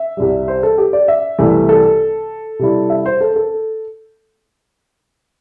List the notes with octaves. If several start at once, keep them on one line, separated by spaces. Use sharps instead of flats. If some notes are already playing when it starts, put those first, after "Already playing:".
Already playing: E5
C2 C3 G3
C5
A4
G4
D5
E5
C2 C3 E3 A3
A4
C3 G3 E4
E5
C5
A4
A4